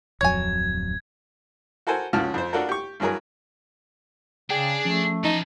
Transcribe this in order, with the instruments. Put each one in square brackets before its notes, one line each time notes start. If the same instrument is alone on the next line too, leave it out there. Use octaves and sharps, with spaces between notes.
[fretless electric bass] D1 F2 F#3 [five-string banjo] C#5 G#5 [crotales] G#6
[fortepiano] F#4 A4 A#4 C5 G#5
C#2 C#3 F3 F#4 A5 F6
F2 C5
D4 F4 F#4 A4 A#4
G4 C#6
G2 E3 F#3 G#4 A#4
[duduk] C#3 [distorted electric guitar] D4 [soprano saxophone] G#4 [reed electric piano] G5
[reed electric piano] F3 C#4 [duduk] A3
[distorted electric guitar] E3 A5 [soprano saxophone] D#4